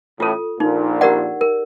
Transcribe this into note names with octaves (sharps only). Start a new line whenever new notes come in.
A1 A2 F4 A4
A#1 A#2 D#4
G4 A#4 D5 F#5
A#4